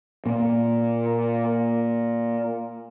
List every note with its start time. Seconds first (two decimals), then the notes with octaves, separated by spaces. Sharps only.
0.26 A#2 A#3